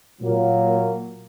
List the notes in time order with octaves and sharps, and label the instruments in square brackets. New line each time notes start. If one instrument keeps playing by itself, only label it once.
[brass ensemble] A#2 F#3 A#3